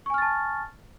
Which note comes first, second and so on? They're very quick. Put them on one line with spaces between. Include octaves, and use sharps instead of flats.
C#6 G#5 F6 A6 A5